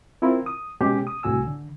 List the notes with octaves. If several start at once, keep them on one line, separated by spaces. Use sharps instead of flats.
C4 E4 F4 A#4
D#6
B2 G#3 C#4 G4 G#4
D#6
C2 A2 F#4 G#5 E6
D3